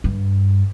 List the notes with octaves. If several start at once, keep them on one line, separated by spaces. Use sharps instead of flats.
G2